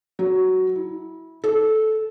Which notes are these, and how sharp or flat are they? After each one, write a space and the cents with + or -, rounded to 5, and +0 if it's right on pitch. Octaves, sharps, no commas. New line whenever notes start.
F#3 +10
E4 -20
A4 -15